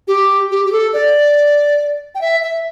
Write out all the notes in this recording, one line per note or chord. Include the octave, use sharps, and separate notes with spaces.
G4
G4
G4
A4
D5
G5
E5
E5